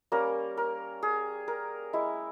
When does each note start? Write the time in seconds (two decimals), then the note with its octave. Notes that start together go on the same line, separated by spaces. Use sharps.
0.12 G3 A#3 C#4 A#4
0.57 A#4
1.03 G#4
1.48 A#4
1.93 G#3 E4